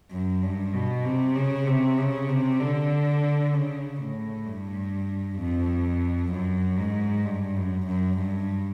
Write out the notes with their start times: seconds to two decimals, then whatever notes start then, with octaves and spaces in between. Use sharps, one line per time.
0.11 F#2
0.42 G2
0.74 B2
1.04 C3
1.35 C#3
1.67 C3
1.97 C#3
2.28 C3
2.59 D3
3.53 C#3
3.99 A2
4.46 G2
5.39 F2
6.32 F#2
6.78 G#2
7.25 G2
7.56 F#2
7.87 F#2
8.18 G2